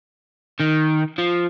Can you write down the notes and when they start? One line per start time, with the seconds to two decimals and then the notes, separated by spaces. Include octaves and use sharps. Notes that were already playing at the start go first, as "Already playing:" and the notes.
0.60 D#3
1.18 F3